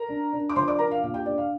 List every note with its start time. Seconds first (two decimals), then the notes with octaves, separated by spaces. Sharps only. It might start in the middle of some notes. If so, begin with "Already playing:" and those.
Already playing: A#4 A#5
0.09 D4
0.33 D4
0.49 D6
0.55 F3 C5 C6
0.68 D5 D6
0.79 D4 A#4 A#5
0.91 F5
1.03 A#2 F5
1.14 G4 G5
1.26 D4 D5
1.38 F5